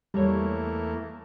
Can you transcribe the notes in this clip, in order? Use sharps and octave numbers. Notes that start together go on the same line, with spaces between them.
E2 G3 A3 A#3 C#5